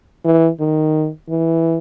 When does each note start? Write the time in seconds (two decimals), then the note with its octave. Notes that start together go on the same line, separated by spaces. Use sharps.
0.25 E3
0.60 D#3
1.29 E3